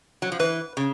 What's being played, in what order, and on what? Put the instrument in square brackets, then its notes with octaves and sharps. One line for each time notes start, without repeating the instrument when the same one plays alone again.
[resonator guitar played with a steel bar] F#3
F3
[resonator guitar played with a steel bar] E3 [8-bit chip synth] B4
[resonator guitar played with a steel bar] C#3